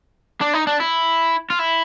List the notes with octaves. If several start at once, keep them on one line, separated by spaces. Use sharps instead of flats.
D4
D#4
D4
E4
F4
E4